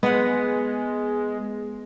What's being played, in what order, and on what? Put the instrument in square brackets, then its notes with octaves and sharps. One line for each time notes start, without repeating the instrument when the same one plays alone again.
[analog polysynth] G#3 [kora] B3 F#5